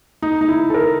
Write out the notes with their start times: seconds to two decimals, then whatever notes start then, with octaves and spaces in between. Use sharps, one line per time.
0.22 D#4
0.41 D#4
0.48 E4
0.70 A4
0.74 A#4